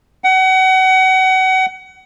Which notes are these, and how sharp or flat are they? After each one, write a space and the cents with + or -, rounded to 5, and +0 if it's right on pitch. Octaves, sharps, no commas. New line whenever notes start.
F#5 +30